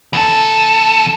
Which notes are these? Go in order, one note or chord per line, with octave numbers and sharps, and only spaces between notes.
E2 A4